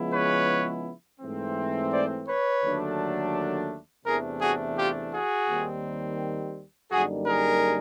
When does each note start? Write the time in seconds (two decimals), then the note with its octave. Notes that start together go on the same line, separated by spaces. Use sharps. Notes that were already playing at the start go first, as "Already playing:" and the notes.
Already playing: C#3 F3 G#3 B3 E4
0.14 B4 C#5
1.20 G#2 E3 A3 C4
1.92 C5 D5
2.28 B4 C#5
2.63 D#2 D3 F#3 A3 D4
4.06 E2 C3 E3 A3 D4 G#4 A#4
4.42 F#4 G#4
4.78 F4 G4
5.13 F#4 G#4
5.49 D#2 D#3 G3 C4
6.91 F#2 D3 G3 A#3 D#4 F#4 G#4
7.27 G#4 A#4